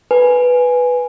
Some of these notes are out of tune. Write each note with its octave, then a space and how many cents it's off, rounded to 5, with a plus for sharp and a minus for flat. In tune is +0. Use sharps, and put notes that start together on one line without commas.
B4 +0 G#5 +0